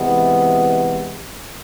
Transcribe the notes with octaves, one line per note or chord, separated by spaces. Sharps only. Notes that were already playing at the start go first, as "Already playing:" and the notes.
Already playing: C3 E3 G#3 B3